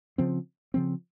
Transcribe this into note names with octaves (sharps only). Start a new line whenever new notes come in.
C#3 F3 C4
C#3 F3 C4